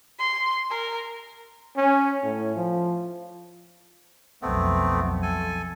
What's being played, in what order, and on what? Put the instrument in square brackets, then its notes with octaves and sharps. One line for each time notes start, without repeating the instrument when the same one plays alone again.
[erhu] C6
A#4
[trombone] C#4
A2
F3
[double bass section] B1 F2 [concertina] A3 B3 C4
[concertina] A4 G#5